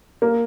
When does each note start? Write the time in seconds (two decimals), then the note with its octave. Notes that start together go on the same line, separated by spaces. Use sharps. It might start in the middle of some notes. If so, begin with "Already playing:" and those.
0.22 A#3